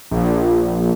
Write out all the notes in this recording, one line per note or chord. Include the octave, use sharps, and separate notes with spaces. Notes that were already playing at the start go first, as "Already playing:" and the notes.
A#1